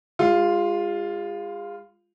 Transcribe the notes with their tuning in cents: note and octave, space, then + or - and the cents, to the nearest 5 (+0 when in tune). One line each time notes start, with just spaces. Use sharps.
G#3 -40 F4 +0